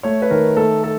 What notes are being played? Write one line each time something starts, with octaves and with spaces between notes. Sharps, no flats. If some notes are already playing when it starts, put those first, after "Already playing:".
A3 C#5
B4
D#3 A#4
A3 A4
A4